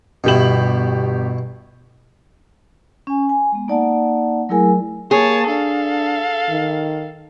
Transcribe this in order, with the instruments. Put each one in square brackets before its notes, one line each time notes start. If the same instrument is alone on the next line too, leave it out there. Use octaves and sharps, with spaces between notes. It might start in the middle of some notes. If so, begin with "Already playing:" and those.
[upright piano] G1 G4 F#7 [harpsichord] B2 E4
[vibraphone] C#4 G#5
G#5
G#3 B3
A#3 D#4 D5 F#5 A5
F#3 A3 E4 G#4 A#4 G#5
[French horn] A#3 [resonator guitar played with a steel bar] G#4 [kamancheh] C#5 A5
[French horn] D4 [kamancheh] A4 F5
[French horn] D#3